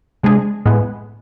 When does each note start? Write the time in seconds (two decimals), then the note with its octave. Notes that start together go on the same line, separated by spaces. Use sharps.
0.23 C3 G#3 D4 G#4
0.66 A2 G#3 B3